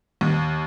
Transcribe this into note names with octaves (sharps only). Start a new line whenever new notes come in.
D#2